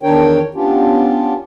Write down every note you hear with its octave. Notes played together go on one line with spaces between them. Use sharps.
E2 D#3 D4 A#4 C#5 G5
B3 C#4 D4 F4 G4